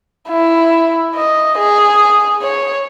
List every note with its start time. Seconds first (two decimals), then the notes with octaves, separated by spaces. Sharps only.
0.28 E4
1.15 D#5
1.59 G#4
2.42 C#5